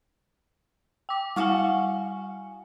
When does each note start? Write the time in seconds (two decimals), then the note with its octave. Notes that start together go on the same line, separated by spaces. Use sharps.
1.09 G5 D6
1.36 G3 F#4 F5 G#5 C#6